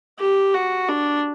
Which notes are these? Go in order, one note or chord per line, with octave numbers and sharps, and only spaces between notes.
G4
F#4
D4